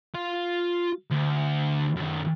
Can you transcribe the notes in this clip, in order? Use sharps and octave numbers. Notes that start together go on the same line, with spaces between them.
F4 F5
D2
F#2 D#3